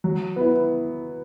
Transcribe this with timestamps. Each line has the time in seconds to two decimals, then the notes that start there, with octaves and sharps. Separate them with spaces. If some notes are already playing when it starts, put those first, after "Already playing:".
0.04 F#3
0.36 B3 E4